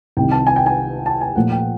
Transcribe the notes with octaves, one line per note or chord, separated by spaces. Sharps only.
C2 C3 D#3 G5
A5
G#5
G5
G#5
A5
G#5
A#2 F3 A3 F#5
G5